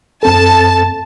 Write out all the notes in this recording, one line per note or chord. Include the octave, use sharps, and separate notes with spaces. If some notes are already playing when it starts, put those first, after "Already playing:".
F#2 C4 A4 A5